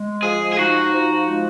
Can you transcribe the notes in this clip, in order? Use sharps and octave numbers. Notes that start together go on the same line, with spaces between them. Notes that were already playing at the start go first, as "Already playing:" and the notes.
Already playing: G#3
F3 G#4
G#4
D#4 F#4
F3
G#3